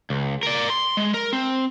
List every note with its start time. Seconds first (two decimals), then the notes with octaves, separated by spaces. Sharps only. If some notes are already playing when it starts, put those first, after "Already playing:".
0.10 C#2
0.43 A#4 D5
0.70 C6
0.97 G#3
1.14 A#4
1.33 C4